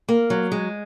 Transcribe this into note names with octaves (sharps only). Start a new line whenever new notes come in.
A#3
F#3
G#3